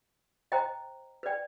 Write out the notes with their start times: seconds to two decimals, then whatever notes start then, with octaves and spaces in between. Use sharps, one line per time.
0.52 C5 D#5 G5 A#5
1.23 B4 D5 G5